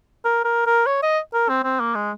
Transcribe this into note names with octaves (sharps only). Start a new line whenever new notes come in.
A#4
A#4
A#4
C#5
D#5
A#4
C4
C4
A#3
G#3